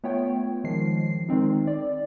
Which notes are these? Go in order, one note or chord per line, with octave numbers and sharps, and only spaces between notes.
A3 B3 F4 C#5 G5
D#3 F3 G#3 C7
D#3 G#3 C4 D#4
D5